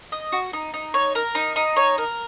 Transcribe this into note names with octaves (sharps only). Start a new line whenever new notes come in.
D#5
F#4
D#4
D#4
C#5
A#4
D#4
D#4
C#5
A#4